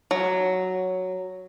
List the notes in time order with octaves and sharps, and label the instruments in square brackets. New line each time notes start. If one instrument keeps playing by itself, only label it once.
[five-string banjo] F#3